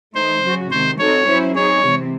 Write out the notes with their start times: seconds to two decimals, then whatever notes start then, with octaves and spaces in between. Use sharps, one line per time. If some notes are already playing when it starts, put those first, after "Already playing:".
0.14 E3 A3 D#4 C5
0.42 C#3 F#3 C#4 F#4
0.71 C3 D#3 G#3 C5
0.98 C4 D#4 F#4 A4 C#5
1.27 F#3 C#4 E4 C5
1.55 C4 D#4 G#4 C#5
1.83 C3 E3 G#3 C4